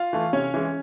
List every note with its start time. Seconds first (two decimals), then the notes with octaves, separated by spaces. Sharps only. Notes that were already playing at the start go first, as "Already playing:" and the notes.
Already playing: F4 F5
0.13 E3 A3
0.33 C3 C#4 C#5
0.54 E3 G#3